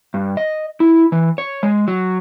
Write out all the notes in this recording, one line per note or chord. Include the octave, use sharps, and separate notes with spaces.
G2
D#5
E4
E3
C#5
G#3
F#3